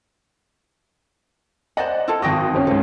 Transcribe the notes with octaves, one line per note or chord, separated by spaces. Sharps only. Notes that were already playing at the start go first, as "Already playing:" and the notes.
C5 D5 D#5 F#5
E4 F4 A4
G#1 F#4 D#5 G5 D#6
G#1 C4 C#4
C#2 G#2 A4